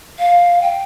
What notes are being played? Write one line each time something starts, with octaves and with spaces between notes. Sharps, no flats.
F5
G5